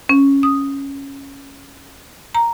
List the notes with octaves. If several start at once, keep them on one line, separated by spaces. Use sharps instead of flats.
C#4
D#6
A#5